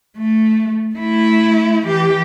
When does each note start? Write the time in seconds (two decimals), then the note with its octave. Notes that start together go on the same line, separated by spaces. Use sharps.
0.17 A3
0.95 A3 E4
1.86 E3 G4